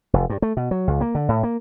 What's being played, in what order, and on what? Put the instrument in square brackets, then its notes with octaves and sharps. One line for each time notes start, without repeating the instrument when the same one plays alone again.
[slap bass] F1
G2
A3
B2
F#3
C#2
A#3
D3
A2
A#3